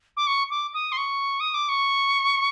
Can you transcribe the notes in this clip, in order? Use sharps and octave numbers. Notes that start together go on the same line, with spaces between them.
D6
C#6
D6
D#6
C6
C#6
D#6
D6
C#6